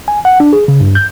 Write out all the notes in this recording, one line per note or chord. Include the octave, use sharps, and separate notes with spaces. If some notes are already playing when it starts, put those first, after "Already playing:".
G#5
F#5
D4
G#4
C#3
G2
G6